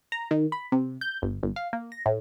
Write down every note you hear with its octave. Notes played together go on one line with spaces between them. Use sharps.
A#5
D#3
B5
C3
G6
G1
G1
F5
A#3
A#6
A2